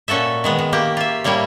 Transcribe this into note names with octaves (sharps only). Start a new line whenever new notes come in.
A#2 C#4 F#4 A4 E5
D#3 G#3 B3
D#3
A#3 G4
F4 E5
A2 G3 A#3 E4 C#5